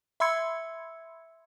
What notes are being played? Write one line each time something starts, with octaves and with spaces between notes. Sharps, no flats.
E5 B5 C6 E6 G#6 C#7